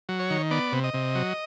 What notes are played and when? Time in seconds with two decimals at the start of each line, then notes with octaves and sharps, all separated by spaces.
0.09 F#3
0.20 C#5
0.30 D#3
0.51 B3 D5
0.72 C3
0.84 D#5
0.94 C3
1.15 F#3